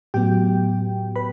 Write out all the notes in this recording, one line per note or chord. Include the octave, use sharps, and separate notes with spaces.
A2 F#3 B3 G4 G5
B4 B5